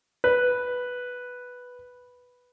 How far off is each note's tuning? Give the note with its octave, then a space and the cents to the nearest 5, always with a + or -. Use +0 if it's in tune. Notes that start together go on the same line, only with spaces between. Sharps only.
B4 +0